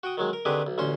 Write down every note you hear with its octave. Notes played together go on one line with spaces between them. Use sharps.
F#4 G5 D#6
D#3 F#3 G#3
A#4
D3 D#3 C4 G4 G#4 B4
B1
A1 D2 C#4 C5 C6